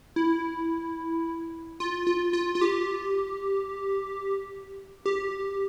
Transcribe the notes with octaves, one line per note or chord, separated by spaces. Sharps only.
E4
F4
F4
F4
F4
G4
G4